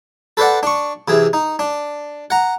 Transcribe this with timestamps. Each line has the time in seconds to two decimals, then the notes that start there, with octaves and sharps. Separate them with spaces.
0.37 A4 B4 C5 D5 F#5
0.63 D4 C#6
1.08 C3 E3 G#4
1.33 D#4
1.59 D4
2.30 F#5 A#5